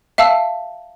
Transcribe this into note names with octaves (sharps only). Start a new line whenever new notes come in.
E5 F5 A5 E6